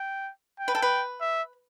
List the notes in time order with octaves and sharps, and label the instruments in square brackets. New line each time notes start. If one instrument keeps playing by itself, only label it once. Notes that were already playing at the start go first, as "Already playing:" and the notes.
Already playing: [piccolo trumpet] G5
G5
[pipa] B4
A4
B4
[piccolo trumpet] E5